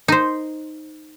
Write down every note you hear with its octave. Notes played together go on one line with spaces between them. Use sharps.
D#4 C5